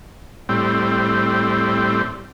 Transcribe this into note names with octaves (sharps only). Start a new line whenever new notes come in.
A2 G3 C4